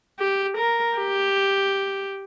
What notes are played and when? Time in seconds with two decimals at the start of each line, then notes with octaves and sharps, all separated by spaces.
0.19 G4
0.58 A#4
0.97 G4